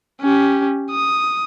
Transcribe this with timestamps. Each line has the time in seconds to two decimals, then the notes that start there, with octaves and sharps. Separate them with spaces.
0.21 C#4 G4
0.91 D#6